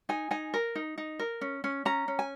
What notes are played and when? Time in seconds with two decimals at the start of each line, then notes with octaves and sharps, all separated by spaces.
0.09 D#4 G#5
0.31 D#4 G#5
0.54 A#4
0.75 D#4
0.98 D#4
1.19 A#4
1.41 C#4
1.64 C#4
1.85 C#4 A#5
2.08 C#4
2.19 G#5